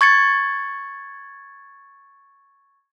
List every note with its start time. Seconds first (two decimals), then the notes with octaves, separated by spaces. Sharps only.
0.01 C#6 G#6 A6 C#7